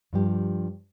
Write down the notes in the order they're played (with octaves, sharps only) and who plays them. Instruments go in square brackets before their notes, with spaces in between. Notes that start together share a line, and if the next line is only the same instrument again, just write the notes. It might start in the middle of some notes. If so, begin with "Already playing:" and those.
[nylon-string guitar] G2 F3 G4